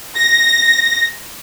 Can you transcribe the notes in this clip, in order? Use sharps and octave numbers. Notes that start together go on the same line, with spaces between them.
A#6